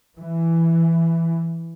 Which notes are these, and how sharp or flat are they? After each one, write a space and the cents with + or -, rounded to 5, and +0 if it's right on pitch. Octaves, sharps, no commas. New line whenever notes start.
E3 +10